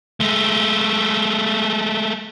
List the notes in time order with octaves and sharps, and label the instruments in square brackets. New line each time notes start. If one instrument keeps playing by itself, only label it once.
[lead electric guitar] G#3 A3